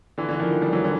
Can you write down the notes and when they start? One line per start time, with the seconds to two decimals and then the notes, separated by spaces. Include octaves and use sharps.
0.18 D3 E3
0.29 D3 E3
0.40 D#3 F3
0.62 F3 G3
0.72 E3 F#3
0.84 D3 E3